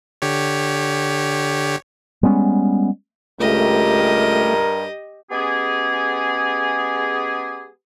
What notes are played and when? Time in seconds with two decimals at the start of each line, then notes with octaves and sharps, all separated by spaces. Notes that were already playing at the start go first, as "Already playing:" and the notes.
0.22 D3 G4 C#5
2.23 G3 G#3 B3 C#4
3.40 C#2 G2 A3 G4 A#4 D#5
5.31 G#3 B3 C#4 G4 G#4